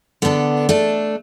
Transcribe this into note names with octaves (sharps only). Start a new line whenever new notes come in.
D3 B3 D4 A4
A3 D4 A4